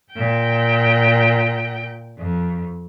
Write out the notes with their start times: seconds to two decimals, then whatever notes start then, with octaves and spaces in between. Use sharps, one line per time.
0.13 A#2 G5
2.18 F2